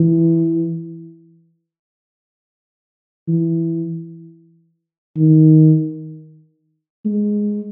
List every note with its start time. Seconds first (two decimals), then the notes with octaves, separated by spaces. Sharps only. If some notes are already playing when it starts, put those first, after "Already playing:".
Already playing: E3
3.28 E3
5.17 D#3
7.05 G#3